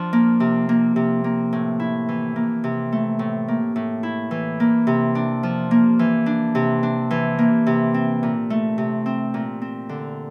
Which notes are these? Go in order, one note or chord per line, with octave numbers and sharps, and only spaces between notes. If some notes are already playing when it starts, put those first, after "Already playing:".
Already playing: F3 D4
A#3
C3
A#3
C3
A#3
A2
E4
E3
A#3
C3
A3
A2
A#3
A2
E4
E3
A#3
C3
D4
F3
A#3
E3
D4
C3
D4
E3
A#3
C3
C4
A#2
A3
C3
C4
A#2
C4
D3